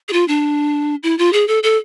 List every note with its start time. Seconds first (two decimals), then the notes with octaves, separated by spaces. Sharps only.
0.09 G#4
0.13 F4
0.28 D4
1.03 E4
1.19 F4
1.33 G#4
1.48 A4
1.63 A4